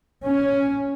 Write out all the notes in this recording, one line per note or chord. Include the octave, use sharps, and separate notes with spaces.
C#4